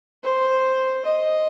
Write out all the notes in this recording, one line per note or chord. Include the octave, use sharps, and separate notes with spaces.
C5
D#5